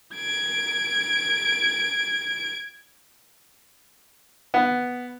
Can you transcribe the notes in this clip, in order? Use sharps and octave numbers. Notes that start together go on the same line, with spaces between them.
G#6 D7
B3